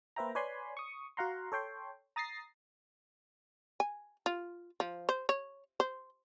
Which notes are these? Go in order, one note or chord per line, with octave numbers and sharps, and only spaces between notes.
A#3 B4 C5 E5 G5 A#5
B4 C#5 D5 G#5 B5 C6
C#6 D#6
F#4 F5 F#5 A#5 C6
A4 C#5 G5 C6
A#5 D#6 A6 A#6 C7
G#5
F4
F3
C5
C#5
C5